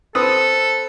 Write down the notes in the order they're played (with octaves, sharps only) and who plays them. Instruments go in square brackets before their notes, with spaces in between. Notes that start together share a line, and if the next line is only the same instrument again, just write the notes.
[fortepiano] C4 B4 D#6 [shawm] A4